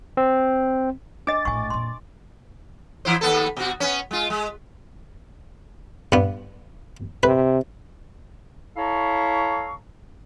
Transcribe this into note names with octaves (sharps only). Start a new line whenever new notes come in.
C4
D4 D#5 D6 A6
A#1 A2 G#5 C#6
F2 A#2 C6
E3 E4 C5
D#2 B3 A4
B2 F#4
B3 C#4
G#3 F4
G#3
G2 B3
C3 B4
E4 A4 C#5 F5 A#5 C#6